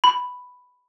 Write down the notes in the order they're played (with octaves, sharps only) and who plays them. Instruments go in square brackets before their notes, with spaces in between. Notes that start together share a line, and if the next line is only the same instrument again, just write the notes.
[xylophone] B5